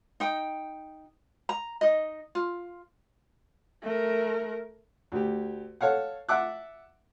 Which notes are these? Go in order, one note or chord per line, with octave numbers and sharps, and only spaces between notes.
D#4 G5
A#5
D#4 D#5
F4
A3 A#4
D2 G4
A4 C#5 F5 F#5
E5 F#5 A5 D6 E6 F#6